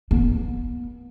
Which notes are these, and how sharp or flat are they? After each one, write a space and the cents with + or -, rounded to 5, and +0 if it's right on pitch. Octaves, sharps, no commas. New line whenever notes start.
B3 -35